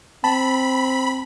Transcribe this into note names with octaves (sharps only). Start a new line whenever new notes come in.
C4 A5 B5